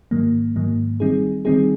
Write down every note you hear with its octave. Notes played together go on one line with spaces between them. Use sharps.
G#2 D#3 F#3 A#3
G#2 D#3 F#3 A#3
D#3 G3 C4 D#4 G#4
D#3 G3 C4 D#4 G#4